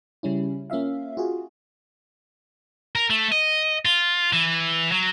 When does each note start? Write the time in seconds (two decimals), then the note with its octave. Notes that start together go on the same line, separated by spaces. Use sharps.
0.23 C#3 G3 C#4 E4
0.70 A#3 C#4 F4 E5 F5
1.17 F4 F#4 G#4
2.96 A#4
3.10 A3
3.32 D#5
3.85 F4
4.33 E3
4.92 F#3